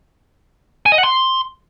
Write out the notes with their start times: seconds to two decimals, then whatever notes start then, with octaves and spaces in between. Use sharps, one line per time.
0.86 G#5
0.92 D#5
0.98 F#5
1.04 C6